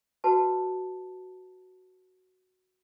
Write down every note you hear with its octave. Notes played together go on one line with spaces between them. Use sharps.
F#4 B4 A5